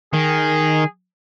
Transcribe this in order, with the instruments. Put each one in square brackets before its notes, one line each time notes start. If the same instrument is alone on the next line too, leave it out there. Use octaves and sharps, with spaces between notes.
[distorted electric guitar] D#3 [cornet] G#4